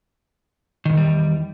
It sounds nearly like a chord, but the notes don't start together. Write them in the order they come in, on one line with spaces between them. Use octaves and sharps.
D#3 G2 E2 G3